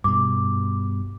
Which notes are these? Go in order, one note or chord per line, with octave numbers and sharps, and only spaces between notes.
G2 B2 D6